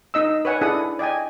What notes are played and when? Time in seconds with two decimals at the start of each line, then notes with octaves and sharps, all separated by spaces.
0.14 D#4 D#5 E6
0.45 B4 C#5 F#5 G#5
0.61 D4 E4 G#4 A4 F#5 D#6
0.99 D5 D#5 G5 G#5